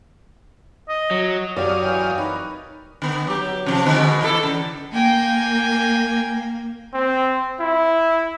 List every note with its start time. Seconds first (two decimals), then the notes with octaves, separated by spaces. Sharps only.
0.89 D#5
1.11 F#3
1.56 F#2 G4 C#5 D5 F5 D#6
1.83 E3 G5
2.18 D#4 A#4 B4 C#5
3.02 D3 B3
3.27 F#3 G4
3.66 C3 F3
3.86 B2 D3 G#3
4.21 E3 E4 A4
4.43 C#3
4.93 A#3 G5 G#5
6.94 C4
7.60 E4